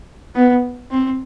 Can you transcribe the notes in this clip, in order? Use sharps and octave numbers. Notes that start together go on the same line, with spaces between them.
B3
C4